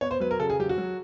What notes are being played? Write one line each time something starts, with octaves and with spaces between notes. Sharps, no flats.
B3 C#5
C5
F#3 B4
A#4
C#3 A4
G#4
F#3 G4
F#4
F#3